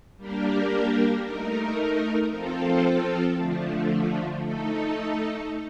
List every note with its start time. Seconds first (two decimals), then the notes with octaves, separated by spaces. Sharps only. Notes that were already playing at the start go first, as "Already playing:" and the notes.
0.17 G3 A#3 D4 G4 A#4
1.24 A3 D#4 A#4
2.30 F3 C4 F4 A4
3.36 D3 F3 A3
4.43 A3 D#4 A4